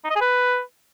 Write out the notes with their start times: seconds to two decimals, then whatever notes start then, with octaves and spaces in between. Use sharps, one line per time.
0.05 D#4
0.10 D#5
0.16 G#4
0.21 B4